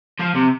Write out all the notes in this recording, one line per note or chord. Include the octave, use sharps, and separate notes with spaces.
F3
C3